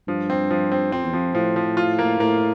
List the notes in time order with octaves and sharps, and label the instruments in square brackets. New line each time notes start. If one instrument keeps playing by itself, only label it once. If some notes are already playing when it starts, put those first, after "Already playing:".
[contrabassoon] G2 [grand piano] F3
[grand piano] C4
F3
C4
[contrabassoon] F2 [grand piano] C4
[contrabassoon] E2
[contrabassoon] F2 [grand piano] F3
[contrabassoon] A2 [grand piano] F3
[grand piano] F3
F4
A#3
[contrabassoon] A2 [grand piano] A#3